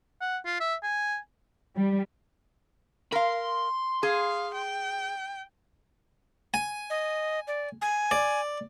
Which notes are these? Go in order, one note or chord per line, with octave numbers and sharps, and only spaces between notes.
F#5
F4
E5
G#5
G3
A#4 F5 B5 C6
G#4 F5
G5
G#5
D#5
D5
G#5
D5